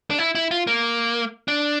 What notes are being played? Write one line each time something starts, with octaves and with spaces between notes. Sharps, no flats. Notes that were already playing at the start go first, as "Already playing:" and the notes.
D4
E4
E4
F4
A#3
D4